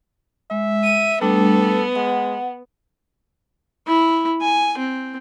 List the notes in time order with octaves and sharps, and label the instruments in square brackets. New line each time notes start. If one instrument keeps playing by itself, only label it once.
[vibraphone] G#3 [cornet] E5
[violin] D#7
[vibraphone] G3 A3 D4 [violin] B3 [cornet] A4
[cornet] G#3 [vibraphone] F#5
[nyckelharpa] E4
G#5
C4